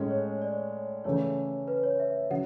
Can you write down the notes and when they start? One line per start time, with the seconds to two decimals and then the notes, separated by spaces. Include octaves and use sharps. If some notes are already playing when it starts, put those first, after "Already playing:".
Already playing: A2 G#3 C#4
0.11 C#5
0.42 D5
1.04 C#3 E3 A3 C#5
1.68 B4
1.83 C#5
2.00 E5
2.30 C#3 F#3 F#5